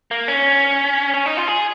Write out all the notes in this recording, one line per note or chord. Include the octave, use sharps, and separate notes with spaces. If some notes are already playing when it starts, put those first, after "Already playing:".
A#3
C#4
C#4
D#4
F4
G#4